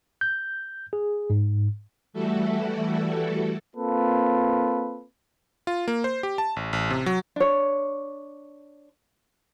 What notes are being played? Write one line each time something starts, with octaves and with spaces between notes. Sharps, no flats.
G6
G#4
G#2
E3 G3 A3 E4 F#4 A4
A#3 C4 F4 A4 B4
F4
A#3
C5
G4
A5
A1
A1
C3
F#3
D4 C#5